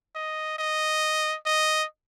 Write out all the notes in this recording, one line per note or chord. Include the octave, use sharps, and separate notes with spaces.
D#5
D#5
D#5